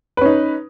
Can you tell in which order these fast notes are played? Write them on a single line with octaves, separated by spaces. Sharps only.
B4 C#4 D#4